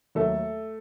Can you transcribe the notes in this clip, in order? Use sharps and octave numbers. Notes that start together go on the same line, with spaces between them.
D#2 D#3 F#3 A3 A4